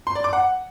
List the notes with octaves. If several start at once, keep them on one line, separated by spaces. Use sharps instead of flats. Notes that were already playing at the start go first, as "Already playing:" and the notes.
C6
D5
D6
F#5